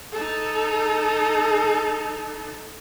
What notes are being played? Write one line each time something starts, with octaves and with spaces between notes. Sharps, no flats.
D#4 A4